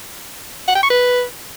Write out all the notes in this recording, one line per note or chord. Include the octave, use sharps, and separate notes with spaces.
F#5
G5
C#6
B4